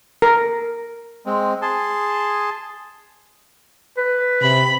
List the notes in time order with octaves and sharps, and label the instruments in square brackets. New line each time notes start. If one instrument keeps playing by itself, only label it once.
[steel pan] A#4
[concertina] G#3 C4
G#4 A5 C6
[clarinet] B4
[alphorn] C3 [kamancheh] B5